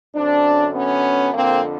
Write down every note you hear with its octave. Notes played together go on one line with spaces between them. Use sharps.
F#2 D3 C4 D4
B3 C#4
F2 D3 A#3 C4